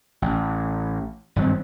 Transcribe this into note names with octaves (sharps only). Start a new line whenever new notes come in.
A1
G#1 G2 F#3 C4